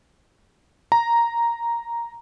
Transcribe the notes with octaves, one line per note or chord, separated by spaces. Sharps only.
A#5